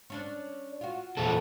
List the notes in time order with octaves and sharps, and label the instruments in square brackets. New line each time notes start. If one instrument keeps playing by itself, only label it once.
[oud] C#4 D4 D5
F4 F#4
[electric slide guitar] E2 A#2 A4